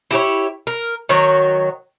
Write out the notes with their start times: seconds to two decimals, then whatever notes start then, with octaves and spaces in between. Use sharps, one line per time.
0.11 E4 G4 B4 C#5
0.67 A#4
1.09 D#3 F#3 C#5